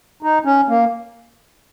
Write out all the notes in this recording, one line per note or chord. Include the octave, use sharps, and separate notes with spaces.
D#4
C#4
A#3